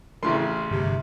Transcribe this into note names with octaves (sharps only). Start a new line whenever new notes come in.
A1 C#3 A3 C6
G1 E2 G2 C3